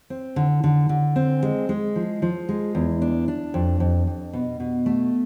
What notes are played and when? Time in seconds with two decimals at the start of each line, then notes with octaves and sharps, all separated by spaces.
0.10 C4
0.36 D3
0.64 D3
0.89 D3
1.16 C4
1.42 G#3
1.69 G#3
1.96 F3
2.22 F3
2.49 G#3
2.75 E2
3.02 D4
3.28 D4
3.54 F2
3.80 F2
4.07 F2
4.33 B2
4.60 B2
4.86 A3